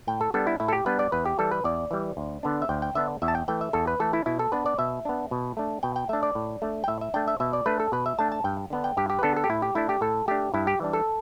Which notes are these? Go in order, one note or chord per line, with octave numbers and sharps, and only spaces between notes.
A2 G5
A4
G3 B3 D4 A4
E4
A2 E4
A4
G4
G3 B3 D4 B4
D5
E2 B4
G4
E3 G3 A4
B4
E2 D5
E3 G3
D2
D3 B3 D4
E5
D2 G5
G5
D3 B3 D4 E5
E2 E5
A5
G5
E3 A3 G5
E5
E2 A4
B4
E3 A3 A4
E4
B2 E4
A4
B3 D4 B4
D5
B2 E5
B3 D4
B2
A3 D4
B2 G5
G5
A3 D4 E5
D5
A2
A3 D4
G5
A2 E5
E5
A3 D4 G5
E5
B2 E5
D5
A3 D4 B4
A4
B2 B4
E5
A3 D4 A5
A5
G2 G5
D3 B3 D4
G5
G2 G4
G4
B4
D3 B3 D4 A4
A4
G4
A2 E4
G4
A3 D4 E4
G4
A2 A4
A3 D4 G4
G2 E4
G4
E3 G3 D4
A4